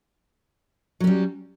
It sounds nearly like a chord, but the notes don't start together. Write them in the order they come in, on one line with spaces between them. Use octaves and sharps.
F#3 C#4 G3